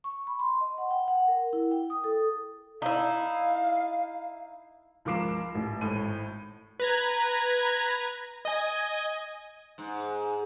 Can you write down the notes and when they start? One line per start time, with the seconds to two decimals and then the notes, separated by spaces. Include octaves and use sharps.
0.04 C#6
0.27 B5
0.39 C6
0.61 D#5
0.78 F#5
0.91 G5
1.08 F#5
1.28 A#4
1.53 E4
1.71 G5
1.90 D#6
2.04 A4
2.82 D#4 E4 F5
5.05 C#2 F3 A#4 D6 C7 E7
5.55 A1
5.81 G#1 A2 D#7
6.80 B4 A#5 G#6
8.45 D#5 G#5
9.78 G#2